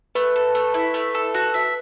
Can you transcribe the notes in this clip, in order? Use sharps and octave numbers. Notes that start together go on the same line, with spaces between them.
A3 B4
A4
A3
E4
A3
A4
F#4
E5